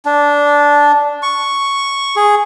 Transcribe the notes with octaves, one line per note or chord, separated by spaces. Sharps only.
D4
C#6
G#4